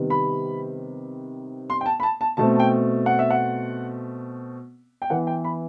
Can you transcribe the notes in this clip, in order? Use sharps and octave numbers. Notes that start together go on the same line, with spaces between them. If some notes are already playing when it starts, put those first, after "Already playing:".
Already playing: C3 D#3 G3 B3
B5
C6
G5
A5
B5
A5
A5
B2 A3 C4 A5
A5
G5
F#5
E5
F#5
G5
E3 B3 F#5
G5
B5